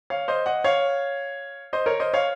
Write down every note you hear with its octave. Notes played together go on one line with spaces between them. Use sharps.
C#5 F5
C5 D#5
D#5 F#5
C#5 F5
C5 D#5
A#4 C#5
C5 D#5
C#5 F5